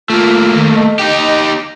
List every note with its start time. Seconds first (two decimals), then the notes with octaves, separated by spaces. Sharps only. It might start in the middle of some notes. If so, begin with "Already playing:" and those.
0.10 A3 A#3 F4
0.55 D#3
0.75 D#5
0.99 D#4 G4